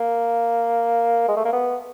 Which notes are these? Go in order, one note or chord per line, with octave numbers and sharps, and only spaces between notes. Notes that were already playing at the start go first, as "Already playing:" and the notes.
Already playing: A#3
G#3
A3
A#3
B3